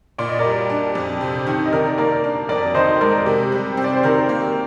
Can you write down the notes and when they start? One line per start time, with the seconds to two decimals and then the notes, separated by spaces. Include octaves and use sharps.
0.18 A#2 D5
0.28 D#5
0.39 A#4 D5
0.44 G3
0.70 D4
0.95 F2
1.21 C3
1.47 D#3
1.66 D#5
1.72 D#3 A#4 D5
1.98 A#3 A#4 D5
2.24 D4
2.49 F2 A#4 D5
2.74 D#3 C5 D#5
3.01 G#3 A#4 D5
3.26 C3 G4 A#4
3.52 G3
3.77 C4
3.84 D5
3.93 C5
4.03 D#3 A#4 D5
4.29 A#3